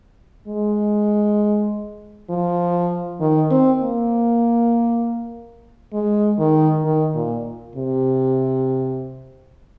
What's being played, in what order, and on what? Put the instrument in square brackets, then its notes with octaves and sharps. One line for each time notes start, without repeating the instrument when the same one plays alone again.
[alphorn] G#3
F3
D#3
C4
A#3
G#3
D#3
D#3
A#2
C3